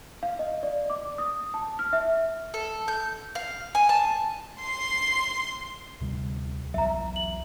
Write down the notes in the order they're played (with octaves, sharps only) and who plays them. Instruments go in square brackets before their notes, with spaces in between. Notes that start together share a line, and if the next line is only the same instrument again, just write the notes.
[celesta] F5
D#5
D5
D6
D#6
A5
F6
E5
[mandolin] A4
G6
F5
G#5
A5
[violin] C6 C7
[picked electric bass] D2 C3 G3
[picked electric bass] B1 E2 F#3 [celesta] E5 A#5
[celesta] F#7